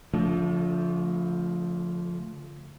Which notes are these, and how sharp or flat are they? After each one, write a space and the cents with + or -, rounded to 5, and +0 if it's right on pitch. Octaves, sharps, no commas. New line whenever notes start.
D3 -45 F3 +0 A3 +0